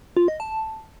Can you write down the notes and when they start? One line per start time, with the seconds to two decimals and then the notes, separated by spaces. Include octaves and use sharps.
0.17 F4
0.28 D#5
0.40 A5